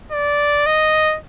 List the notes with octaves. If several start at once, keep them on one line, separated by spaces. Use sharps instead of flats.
D5
D#5